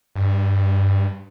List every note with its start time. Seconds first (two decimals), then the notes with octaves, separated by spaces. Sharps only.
0.15 G2